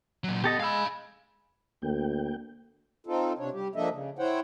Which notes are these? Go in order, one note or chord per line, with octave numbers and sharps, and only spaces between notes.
A#2 F#3
B3 G4 A4 D#5
G#3 F5 B5 E6
D2 A#3 G5
C4 D#4 F4 A4
C3 D4 C#5
G3 G4
F3 A#3 D4 A4 D#5 E5
C#3
E4 C5 C#5 F#5 G5